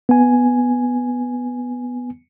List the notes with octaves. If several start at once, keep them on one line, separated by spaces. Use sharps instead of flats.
B3 G#5